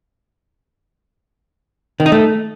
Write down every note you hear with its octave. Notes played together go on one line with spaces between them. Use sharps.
D#3
D#4
A3